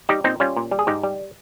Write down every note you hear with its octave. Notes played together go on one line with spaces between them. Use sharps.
G3 D#4 G4
A#2 C4 D#4
G3 C#4 F4
A#2
G3
G#4
G#2 D#4 G4
G3